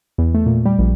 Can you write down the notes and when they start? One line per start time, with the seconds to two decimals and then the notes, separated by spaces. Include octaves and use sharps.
0.18 E2
0.34 A3
0.46 A#2
0.66 G3
0.79 A#1